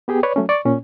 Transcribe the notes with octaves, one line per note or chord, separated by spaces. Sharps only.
B3 G4 G#4 G5
B4 C#5 D5
F#3 A3 C#4
D5 C#6
A#2 C#4